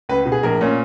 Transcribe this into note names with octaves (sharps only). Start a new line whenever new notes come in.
C#2 B4
B2
G#4
A#1 A#4
A#2 C#4